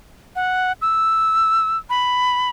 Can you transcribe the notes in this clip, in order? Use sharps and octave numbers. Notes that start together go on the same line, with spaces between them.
F#5
E6
B5